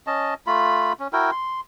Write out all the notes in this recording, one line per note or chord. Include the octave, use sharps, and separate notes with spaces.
C#4 D#5 A5
A3 F4 B5
C#4
E4 F#4 A#4 G5
C6